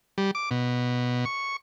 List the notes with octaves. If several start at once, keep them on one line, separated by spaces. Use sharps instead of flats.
G3
D6
B2
C#6